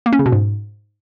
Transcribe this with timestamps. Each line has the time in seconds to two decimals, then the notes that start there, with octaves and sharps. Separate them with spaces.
0.06 A#3
0.13 C#4
0.19 C#3
0.26 B2
0.32 G#2